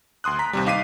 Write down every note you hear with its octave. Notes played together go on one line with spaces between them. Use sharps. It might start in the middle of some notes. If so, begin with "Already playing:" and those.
D2 C6 D#6 F#6
A#5 B6
D#2 C3 G3
D#4 F5 D6 B6 C7 D#7